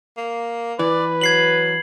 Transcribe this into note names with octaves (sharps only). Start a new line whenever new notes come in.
A#3
E3 B4 D5
F#3 G#6 C7 F#7